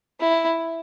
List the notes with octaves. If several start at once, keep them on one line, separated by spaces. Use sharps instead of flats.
E4